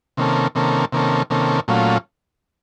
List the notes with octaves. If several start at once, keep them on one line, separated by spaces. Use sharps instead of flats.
C3 D#3 A#3 C#4 A4
C3 D#3 A#3 C#4 A4
C3 D#3 A#3 C#4 A4
C3 D#3 A#3 C#4 A4
A#2 F#3 A3 C#4 F4